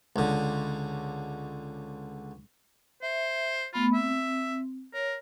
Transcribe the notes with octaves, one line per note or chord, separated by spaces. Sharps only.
C#2 D3
C5 E5
A3 B3 F4 B5
C4 E5
A#4 C#5